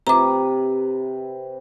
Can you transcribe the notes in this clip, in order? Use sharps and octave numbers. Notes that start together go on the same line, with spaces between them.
C3 B4 A#5 D6